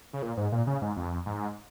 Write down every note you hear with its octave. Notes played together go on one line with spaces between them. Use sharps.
C#3
A#2
G#2
A#2
C#3
G#2
F2
G#2